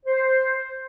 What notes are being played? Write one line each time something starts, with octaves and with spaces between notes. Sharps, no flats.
C5